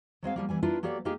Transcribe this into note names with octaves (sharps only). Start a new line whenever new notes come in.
F#3 G#3 C4 F5
F3 G3 A#3
E3 G3 G#5
D4 E4 F4 A#4 B4 E5
F#3 A#3 G4 A4 D5
G#3 A#3 D#4 F4 G4 G#4